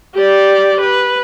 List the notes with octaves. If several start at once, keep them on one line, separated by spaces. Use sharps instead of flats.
G4 D5
B4